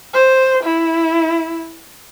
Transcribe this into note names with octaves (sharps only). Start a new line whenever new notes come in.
C5
E4